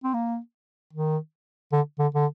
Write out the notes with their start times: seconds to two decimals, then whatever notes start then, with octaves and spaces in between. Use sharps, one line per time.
0.03 C4
0.14 A#3
0.93 D#3
1.72 D3
1.99 D3
2.15 D3